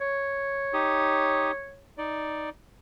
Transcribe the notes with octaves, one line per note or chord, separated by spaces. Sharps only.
C#5
D#4 G4 D#6
D#4 D5